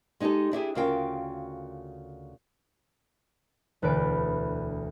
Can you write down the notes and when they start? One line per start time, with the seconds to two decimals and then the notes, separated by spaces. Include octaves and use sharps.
0.20 G#3 D#4 F#4 G4 A4
0.52 D4 E4 G4 G#4
0.75 D2 C#3 F4 A#4 F5 G5
3.82 E1 D2 B4 D5 D7